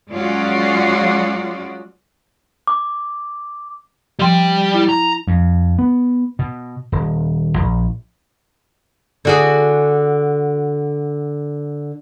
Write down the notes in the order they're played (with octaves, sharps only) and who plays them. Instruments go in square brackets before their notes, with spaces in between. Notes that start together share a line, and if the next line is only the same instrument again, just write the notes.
[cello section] F#3 G#3 C#4 F4 F#4 D5
[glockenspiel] D6
[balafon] F3 C6 [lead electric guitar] G3 G5
[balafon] E4
[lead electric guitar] A#5
[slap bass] F2
B3
B2
D#1
A#1
[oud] D3 F#4 G#4